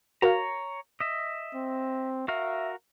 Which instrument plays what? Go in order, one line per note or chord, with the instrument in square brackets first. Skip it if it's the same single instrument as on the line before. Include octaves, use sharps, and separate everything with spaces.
[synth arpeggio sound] F#4 A#4 F5 [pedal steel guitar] C#5 A#5
[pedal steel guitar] D#5 E5
[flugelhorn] C4
[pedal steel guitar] F#4 A#4 F5 [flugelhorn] E5